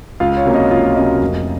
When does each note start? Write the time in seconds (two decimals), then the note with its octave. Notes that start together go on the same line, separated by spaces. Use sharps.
0.20 C#2 F4 F5
0.37 C#5
0.45 C3 F#3 A#3 C#4
0.54 D#5
0.71 C#2 F4 F5
0.96 C3 F#3 A#3 C#4 D#5
1.21 F1